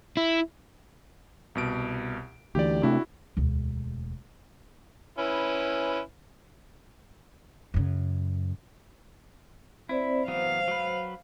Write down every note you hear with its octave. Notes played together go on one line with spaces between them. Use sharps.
E4
C2 B2 D7
D2 E3 G4 D5
C3 A3 D4 E4 F#4
E1 D2
C#4 E4 B4
F#2 C#3
C4 E4 C5 D5
E3 F#3 B3 C5 F5
F#3 B4